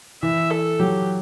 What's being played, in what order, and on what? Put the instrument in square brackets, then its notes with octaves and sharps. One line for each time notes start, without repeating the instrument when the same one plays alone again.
[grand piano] E3 [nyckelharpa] E5
[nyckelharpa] A4
[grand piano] F#3 [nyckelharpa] G4